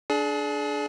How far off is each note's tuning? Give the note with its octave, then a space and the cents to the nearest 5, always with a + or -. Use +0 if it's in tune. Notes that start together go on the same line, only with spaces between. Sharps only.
D4 +0 G#4 +35